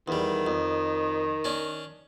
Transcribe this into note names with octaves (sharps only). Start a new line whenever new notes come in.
E2 D#3 G3
F2
C#4 D4